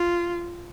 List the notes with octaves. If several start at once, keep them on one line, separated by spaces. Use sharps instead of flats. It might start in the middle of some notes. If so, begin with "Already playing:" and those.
Already playing: F4